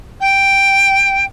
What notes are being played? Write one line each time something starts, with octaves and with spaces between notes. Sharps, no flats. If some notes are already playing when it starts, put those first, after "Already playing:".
G5